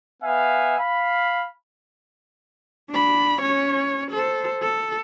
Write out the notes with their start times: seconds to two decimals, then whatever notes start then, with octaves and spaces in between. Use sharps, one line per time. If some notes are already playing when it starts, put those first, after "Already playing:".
0.21 B3 E5 F5 G#5
0.79 F5 B5
2.90 D4 B5
3.40 C#4 C#5
4.11 A4 C5
4.62 A4